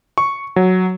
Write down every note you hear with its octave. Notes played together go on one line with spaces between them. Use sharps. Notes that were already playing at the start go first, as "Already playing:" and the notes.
C#6
F#3